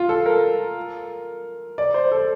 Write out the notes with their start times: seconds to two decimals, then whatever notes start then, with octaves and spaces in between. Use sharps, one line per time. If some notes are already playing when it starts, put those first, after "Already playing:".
Already playing: F4
0.09 A4
0.26 A#4
1.78 D5
1.94 C5
2.11 A4